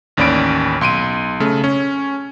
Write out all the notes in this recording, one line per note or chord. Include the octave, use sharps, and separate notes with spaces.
A1 D#2 C#4 D5 B5 D7
B1 C6 D7 D#7
C#3 A3
C#4